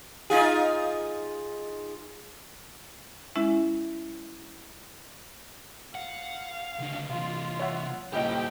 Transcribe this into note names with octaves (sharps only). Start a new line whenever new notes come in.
D#4 F4 G#4
G#3 C#4 E4 E5
F5 F#5
C#2 D3
C3 E3 F4 F5
C#5 E5 F#5
D#1 C#2 E4 G4 D#5 G5